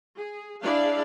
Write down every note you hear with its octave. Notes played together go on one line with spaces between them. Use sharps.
G#4
D4 E4 G#4 D5 F5